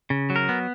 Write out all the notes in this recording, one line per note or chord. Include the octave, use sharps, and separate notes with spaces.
C#3
F#3
A#4
B3